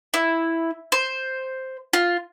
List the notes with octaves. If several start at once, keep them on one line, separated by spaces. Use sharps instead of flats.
E4
C5
F4